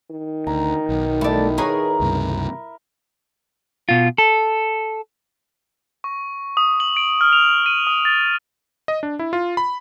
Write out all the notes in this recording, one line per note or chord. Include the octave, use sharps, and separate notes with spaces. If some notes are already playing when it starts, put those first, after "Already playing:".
D#3
D2 A#5
B1
A3 E4 D5
G#4 A#4 B4 C#5 A#5
C#2 G2 C3
B2 F4
A4
C#6
D#6
F#7
D7
F6
F7
D#7
D#6
A6
D#5
D4
E4
F4
B5